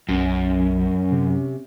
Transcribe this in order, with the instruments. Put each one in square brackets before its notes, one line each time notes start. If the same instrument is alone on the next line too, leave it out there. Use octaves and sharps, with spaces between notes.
[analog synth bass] B1 [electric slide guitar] F#2 [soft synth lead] C#4
[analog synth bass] C3